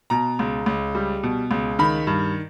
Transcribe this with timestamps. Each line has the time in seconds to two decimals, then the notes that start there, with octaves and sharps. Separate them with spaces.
0.10 B2 A#5
0.39 C#2
0.66 C#2
0.95 G3
1.23 B2
1.51 C#2
1.79 D#3 B5
2.07 G2